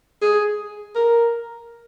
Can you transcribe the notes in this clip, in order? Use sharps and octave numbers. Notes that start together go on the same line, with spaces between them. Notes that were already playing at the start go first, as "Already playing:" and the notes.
G#4
A#4